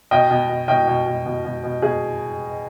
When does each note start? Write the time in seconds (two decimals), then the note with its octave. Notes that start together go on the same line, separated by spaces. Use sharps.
0.11 B2 D#5 G5
0.31 B2
0.49 B2
0.68 B2 D#5 G5
0.87 B2
1.06 B2
1.26 B2
1.45 B2
1.63 B2
1.82 B2 G#4